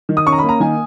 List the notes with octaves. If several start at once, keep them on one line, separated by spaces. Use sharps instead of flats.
D#3
D#6
C#4 C#6
A#5
A#3 B5
A#5
D#3 G#5